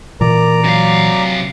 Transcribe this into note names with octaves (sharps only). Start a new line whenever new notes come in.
A#2 E3 A#4 D5 A#5
C3 F#3 F5